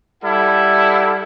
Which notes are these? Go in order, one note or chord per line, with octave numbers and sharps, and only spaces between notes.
G3 E4 A4 F#5